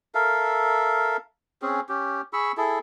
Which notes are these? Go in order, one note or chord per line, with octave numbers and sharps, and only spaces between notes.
A4 A#4 E5 F5
C4 C#4 G#4
C#4 G4
G#4 B5 C#6 E6
E4 G#4 A4